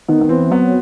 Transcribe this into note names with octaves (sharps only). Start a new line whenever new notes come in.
D#3 B3
B3
E3 C4
F#3 B3